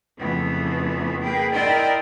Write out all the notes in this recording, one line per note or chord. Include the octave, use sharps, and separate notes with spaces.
F2 C#3 E3 F3 A3 B3
A#3 G#4 B4 G5
E4 A#4 D5 D#5 G5 C6